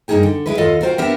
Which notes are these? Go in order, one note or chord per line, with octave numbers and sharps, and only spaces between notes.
G2 A#3 D#4 E4 G#4 G5
D3
G#3 E4 B4
D#2 F4 A4 D#5 F5
F4 F#4 A#4 C5 F5 G5
B3 C4 D4 G4 A#4 E5